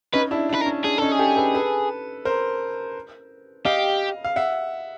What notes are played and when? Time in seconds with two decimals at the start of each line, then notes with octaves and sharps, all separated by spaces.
0.13 C#4 D#4 B4
0.31 D4 E4
0.49 D4
0.54 B4
0.61 A#4
0.66 C#4
0.84 D4 G#4
0.98 C#4 D#4 A4
1.12 G#4
1.19 G4 A4
1.37 A4 B4
1.55 A4 B4
2.25 A#4 C5
3.65 G4 D#5 F5
4.24 F5
4.36 E5 F#5